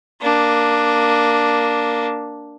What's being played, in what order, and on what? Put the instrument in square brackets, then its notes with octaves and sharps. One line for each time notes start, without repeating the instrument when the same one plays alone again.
[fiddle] A#3 D4